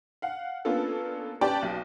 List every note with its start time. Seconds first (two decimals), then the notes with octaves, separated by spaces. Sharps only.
0.22 F5 F#5
0.65 A#3 B3 C#4 D4 F4 A4
1.41 C#4 G4 B4 D5 G5 A5
1.62 B1